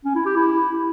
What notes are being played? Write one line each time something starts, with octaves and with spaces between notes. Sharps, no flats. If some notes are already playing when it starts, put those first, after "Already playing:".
C#4
E4
G4
E4